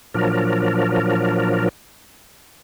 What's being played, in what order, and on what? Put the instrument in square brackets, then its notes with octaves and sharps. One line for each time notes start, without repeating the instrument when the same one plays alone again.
[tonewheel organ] A#2 F3 F#3 D4 A#4